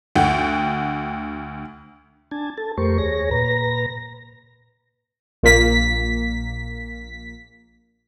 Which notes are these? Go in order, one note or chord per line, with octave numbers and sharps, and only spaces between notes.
D2 F#5 G5
D4 G#5 A5
A4 A5
F2 A3 G4 A#4 C5 C#6
D#2 G#4 C#5 A#6
A#2 B4 A#5 A#6
A#1 A#2 A#3 B6